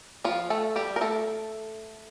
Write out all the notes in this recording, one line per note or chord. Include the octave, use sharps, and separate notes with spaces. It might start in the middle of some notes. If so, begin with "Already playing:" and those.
F3 F4
A3 A4
G3 G4
A#4
A3 A4